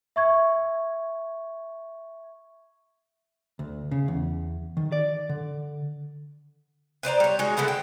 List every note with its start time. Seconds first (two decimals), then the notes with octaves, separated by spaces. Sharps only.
0.16 E5 C#6 G#6
3.59 D2
3.91 C#3
4.08 E2
4.77 D#3
4.92 D5
5.29 D3
7.03 B4 C5 D5 A#5
7.20 G3 C#5
7.39 G#3 D#4 F#4
7.57 D3 G#3 A3 B3
7.68 G5